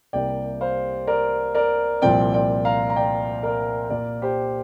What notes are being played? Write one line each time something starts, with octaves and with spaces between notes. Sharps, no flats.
C2 C3 G3 A#3 D5 G5
C5 F5
A#4 D5
A#4 D5
C2 A#2 F3 C4 D5 G5
D5 G5
F5 A#5
A#5
D5 G5
A#4 D5
A#2 A#3 A#4 D5
G4 C5